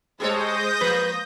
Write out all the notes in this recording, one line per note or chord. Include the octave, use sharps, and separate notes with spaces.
G#3 G4 A4 C5 C#5 D#6 G6 A#6
F3 A#3 B4